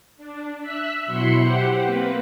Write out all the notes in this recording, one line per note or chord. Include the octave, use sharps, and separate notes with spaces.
D4
E5 E6 F#6 B6
B2 F#3 E4 B5 C6 C#7
G4 C5 F#5
A#3 C4 B4